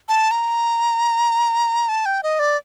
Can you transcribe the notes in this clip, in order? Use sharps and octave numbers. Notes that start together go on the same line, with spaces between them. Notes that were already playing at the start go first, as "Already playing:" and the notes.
A5
A#5
A5
G5
D#5
D5